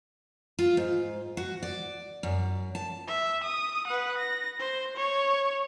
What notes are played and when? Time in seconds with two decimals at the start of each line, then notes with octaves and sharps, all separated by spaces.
0.59 F4
0.77 G#2
1.37 F#4
1.62 D5
2.23 F#2
2.75 A5
3.08 E5
3.44 D#6
3.87 B4 F#5
4.18 A#6
4.59 C5
4.97 C#5